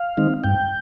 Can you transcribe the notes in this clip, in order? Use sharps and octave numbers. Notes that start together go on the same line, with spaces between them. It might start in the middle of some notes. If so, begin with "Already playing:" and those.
Already playing: F5
D#3 G#3 C4 D#4
G2 G5